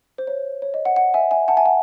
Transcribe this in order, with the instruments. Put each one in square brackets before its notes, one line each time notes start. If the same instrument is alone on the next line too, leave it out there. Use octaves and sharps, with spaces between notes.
[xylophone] C5
C#5
C#5
D#5
F#5
F#5
E5 G#5
E5 G#5
F#5 A5
E5 G#5
F#5